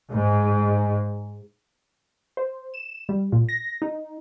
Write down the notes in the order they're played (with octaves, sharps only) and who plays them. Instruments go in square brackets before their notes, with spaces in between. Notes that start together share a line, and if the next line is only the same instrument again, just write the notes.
[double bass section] G#2
[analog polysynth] C5
E7
G3
A#2
A#6
D#4